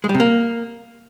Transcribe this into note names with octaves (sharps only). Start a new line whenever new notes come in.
G#3
G3
C3
A#3